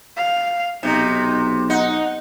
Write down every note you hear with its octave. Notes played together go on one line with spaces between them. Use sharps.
F5
B1 C3 D#4
D#4 F#5